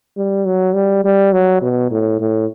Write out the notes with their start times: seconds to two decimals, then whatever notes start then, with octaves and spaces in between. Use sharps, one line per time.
0.17 G3
0.46 F#3
0.75 G3
1.04 G3
1.33 F#3
1.62 B2
1.91 A2
2.20 A2